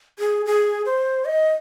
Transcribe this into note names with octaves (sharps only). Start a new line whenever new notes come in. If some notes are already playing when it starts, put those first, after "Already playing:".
G#4
G#4
C5
D#5